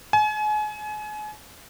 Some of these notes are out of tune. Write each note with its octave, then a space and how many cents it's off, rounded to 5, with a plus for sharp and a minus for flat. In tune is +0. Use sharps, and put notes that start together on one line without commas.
G#5 +35